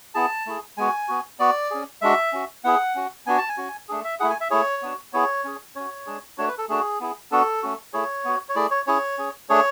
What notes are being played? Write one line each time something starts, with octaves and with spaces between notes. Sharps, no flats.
B3 E4 G#4 A5
A3 E4 G#4
G#3 B3 F#4 G#5
B3 F#4
B3 F#4 D5
C#4 G#4
G#3 D4 F#4 E5
C#4 F#4
B3 E4 G#4 F#5
C#4 F#4
B3 D4 F#4 G#5
A5
G#5
C#4 F#4
A3 D4 G#4
E5
A3 E4 G#4 F#5
G#5
E5
A3 E4 G#4 C#5
B3 D4 F#4
B3 E4 G#4 C#5
C#4 G#4
C#4 F#4 C#5
G#3 D4 G#4
A3 D4 F#4 C#5
B4
A4
A3 D4 F#4 G#4
B3 E4 G#4
B3 D4 F#4 A4
A3 C#4 F#4
A3 E4 G#4 C#5
B3 F#4
C#5
A3 E4 G#4 D5
C#5
C#4 E4 G#4 C#5
C#4 G#4
A3 D4 G#4 C#5